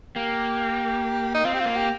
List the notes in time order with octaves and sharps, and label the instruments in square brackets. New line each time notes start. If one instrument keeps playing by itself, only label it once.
[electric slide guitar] A#3 [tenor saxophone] G4
[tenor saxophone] D#4
[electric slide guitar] C4 [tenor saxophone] F4
[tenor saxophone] G4
F4
[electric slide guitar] A#3
[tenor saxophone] G4